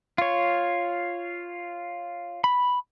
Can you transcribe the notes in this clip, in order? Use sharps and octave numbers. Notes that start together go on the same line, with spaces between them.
F4 C#5
B5